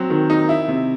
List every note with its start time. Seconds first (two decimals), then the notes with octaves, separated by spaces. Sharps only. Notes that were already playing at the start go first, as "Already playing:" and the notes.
Already playing: F#3 C4
0.10 D#3
0.30 D#4
0.49 E4
0.68 C3